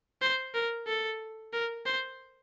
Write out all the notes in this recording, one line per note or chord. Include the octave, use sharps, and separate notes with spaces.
C5
A#4
A4
A#4
C5